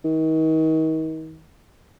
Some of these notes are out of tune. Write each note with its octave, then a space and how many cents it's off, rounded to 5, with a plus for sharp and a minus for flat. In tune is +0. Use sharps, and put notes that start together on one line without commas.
D#3 +35